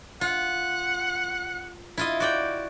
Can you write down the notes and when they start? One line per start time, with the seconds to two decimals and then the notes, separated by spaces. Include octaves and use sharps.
0.21 F4 F#5
1.98 E4 F4 D#5
2.20 F#4 D5 G5